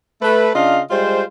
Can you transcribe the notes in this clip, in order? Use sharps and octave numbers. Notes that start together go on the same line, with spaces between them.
A3 B4
C#3 D4 F4 D#5 F5
G3 G#3 F4 C5